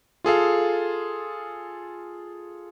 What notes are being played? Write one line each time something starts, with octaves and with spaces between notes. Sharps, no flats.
F4 G#4 A4 F5